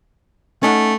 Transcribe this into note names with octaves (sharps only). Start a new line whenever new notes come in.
A3 C#4 D#4 F#5